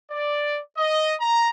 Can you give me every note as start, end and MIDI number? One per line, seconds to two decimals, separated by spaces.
0.10 0.59 74
0.77 1.14 75
1.21 1.49 82